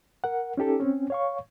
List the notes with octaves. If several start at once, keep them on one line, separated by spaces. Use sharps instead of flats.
A#4 F#5
C#4 D#4 G4 A4
C4 C#4
C#5 F5 C#6